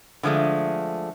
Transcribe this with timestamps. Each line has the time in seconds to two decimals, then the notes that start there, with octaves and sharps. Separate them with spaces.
0.23 D3 F3 G#3 A3